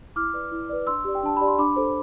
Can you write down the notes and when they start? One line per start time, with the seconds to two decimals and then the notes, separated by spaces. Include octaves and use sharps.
0.16 E4 D6 F6
0.34 B4 D5
0.52 E4
0.69 B4 D5
0.87 D4 C6 E6
1.05 G4 D5
1.15 G5
1.23 D4 A5
1.37 G4 D5 B5
1.48 C6
1.59 D4 B5 D6
1.76 A4 C5